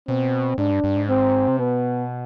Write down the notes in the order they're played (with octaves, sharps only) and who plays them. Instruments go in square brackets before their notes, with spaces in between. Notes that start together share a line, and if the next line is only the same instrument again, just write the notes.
[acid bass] B2 [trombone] C4
[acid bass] G#2 [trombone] D4
[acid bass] G2
G2
G#2
[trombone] C4
[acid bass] C3
[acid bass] B2 [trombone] B3